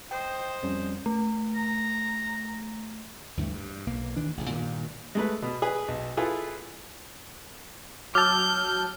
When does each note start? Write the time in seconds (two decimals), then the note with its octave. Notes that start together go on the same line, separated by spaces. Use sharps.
0.11 C5 D#5 G5
0.63 F2 G3 C#4
1.06 A3
1.55 A#5
3.37 D2 G2 E3 A3
3.54 G2
3.86 B1 A#3
4.16 D2 D#3 E3 D4
4.37 A1 C#3
4.49 G2 A#2 D#3
5.15 G#3 A3 B4
5.42 B2
5.62 G#4 B4
5.88 B1
6.17 E4 F4 G#4 A4 B4
8.15 F#3 A5 D6 E6 F6 G6